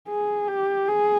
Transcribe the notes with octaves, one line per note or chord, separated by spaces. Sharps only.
G#4
G4
G#4